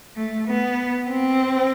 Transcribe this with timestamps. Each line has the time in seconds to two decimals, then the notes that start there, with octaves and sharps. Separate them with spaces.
0.16 A3
0.48 B3
1.09 C4